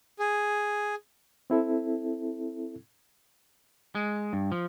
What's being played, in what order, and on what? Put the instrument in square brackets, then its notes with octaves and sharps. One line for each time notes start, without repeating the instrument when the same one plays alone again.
[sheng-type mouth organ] G#4
[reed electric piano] C4 E4 A4
[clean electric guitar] G#3
G2
F3